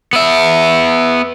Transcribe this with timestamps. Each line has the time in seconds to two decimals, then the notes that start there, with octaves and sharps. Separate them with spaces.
0.13 B3 E5